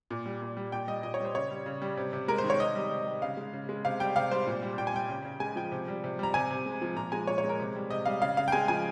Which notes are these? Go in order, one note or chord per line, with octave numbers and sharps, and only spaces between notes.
A#2
G3
A#2
G3
A#2 G5
G3 D#5
A#2 D#5
C#5
G3 C5
C#3 C#5
G3
C#3
G3
C3
C3
G#3 A#4
C5
D#3
C#5
C3 D#5
G3
C3
G3
C#3 F5
G#3
C#3
G#3
C3 F5
G3 G5
C3 F5
G3 C5
A#2
G3
A#2 G5
G#5
G3 G5
C#3
C#3
G#3 G#5
F3 G5
C3
G3
C3
G3 A#5
C3 G#5
C3
G#3
F3
A#2 A#5
G#3 G#5
A#2 C#5
C#5
G#3
A#4
C3
G3
C3 D#5
G3 F5
C#3 F5
C#3 F5
G5
G#3 G#5
F3 G#5